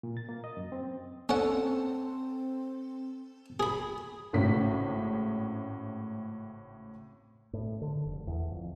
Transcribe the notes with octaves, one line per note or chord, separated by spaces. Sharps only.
A#2
A6
A#3
D#5
F#2
C4
C4 C#4 A4 F#5
G#4 B5
G#1 A2 C#3 B6
A2
D3
F1
E2
F2